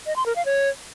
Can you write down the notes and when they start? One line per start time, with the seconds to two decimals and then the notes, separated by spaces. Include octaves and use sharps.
0.06 D#5
0.16 C6
0.26 A#4
0.36 F5
0.46 C#5